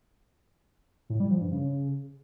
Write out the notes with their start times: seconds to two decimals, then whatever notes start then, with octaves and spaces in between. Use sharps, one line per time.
1.09 A2
1.20 G3
1.30 F3
1.41 G2
1.51 C#3